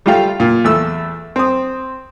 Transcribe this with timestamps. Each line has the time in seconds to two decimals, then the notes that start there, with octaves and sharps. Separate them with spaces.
0.06 G3 A3 F4 F5 G5
0.40 A#2
0.64 E2 A3 E6
1.36 C4 D#6